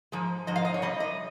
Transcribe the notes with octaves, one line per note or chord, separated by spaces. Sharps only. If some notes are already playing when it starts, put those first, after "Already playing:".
G#2 F3 G#3
G#2 F3 D#5
F5
D#5
C#5
C3 G3 D#5
D#5